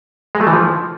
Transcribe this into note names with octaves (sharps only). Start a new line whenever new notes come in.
G#3
A3
E3
F3